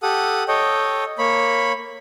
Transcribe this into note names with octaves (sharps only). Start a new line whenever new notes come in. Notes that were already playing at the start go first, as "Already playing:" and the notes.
G4 A4 F#5 D#6
A4 C#5 D#5 G5
A#3 C#5 B5